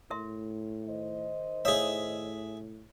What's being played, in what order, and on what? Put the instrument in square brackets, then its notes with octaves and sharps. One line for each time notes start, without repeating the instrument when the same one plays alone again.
[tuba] A2 [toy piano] A#4 E5 C6
[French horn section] D#3 C5 D#5
[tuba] A2 [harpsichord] G#4 E5 [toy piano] C#5 F5 D#6